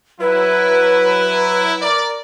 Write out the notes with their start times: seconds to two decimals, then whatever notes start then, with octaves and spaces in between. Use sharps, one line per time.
0.21 F#3 E4 B4
1.82 A#4 D5